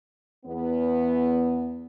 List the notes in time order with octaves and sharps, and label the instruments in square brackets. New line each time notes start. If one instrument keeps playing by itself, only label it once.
[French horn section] E2 B3